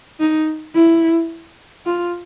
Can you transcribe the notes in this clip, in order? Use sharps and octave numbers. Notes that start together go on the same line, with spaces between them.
D#4
E4
F4